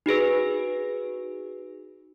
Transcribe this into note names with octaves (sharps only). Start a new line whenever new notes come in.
D#4 F#4 G#4 B4